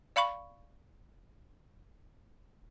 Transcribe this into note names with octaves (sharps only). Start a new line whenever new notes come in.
D5 F5 B5 C#6